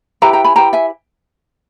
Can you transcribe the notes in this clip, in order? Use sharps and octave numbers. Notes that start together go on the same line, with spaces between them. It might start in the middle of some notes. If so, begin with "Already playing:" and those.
E4 G4 B4 G5 A#5
G5 A#5
G#5 B5
E4 G4 B4 G5 A#5
E5 G#5